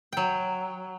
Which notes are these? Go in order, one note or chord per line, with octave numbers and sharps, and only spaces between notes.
F#3 G5